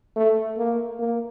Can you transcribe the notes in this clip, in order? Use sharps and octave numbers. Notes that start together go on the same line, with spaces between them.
A3
A#3
A#3